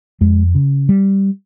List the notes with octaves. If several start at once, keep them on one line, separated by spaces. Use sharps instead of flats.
F2 G#3
C#3
G3